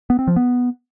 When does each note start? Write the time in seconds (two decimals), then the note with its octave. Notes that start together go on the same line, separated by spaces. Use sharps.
0.10 B3
0.19 C4
0.28 F3
0.36 B3